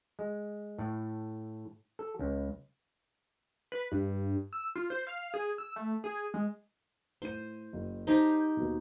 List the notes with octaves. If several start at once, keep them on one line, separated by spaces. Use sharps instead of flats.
G#3
A2
A4
C#2
B4
G2
E6
F4
C5
F5
G#4
E6
A3
G#4
G#3
A2 C5 D#7
F#1
D#4 G4 C5 A5 A#5
D#2 B2